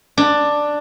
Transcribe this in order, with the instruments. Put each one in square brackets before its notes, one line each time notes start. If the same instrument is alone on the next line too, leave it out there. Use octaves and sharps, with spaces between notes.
[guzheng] D4